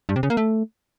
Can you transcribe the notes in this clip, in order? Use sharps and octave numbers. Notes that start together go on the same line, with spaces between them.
G2
C3
C#3
A#3
A3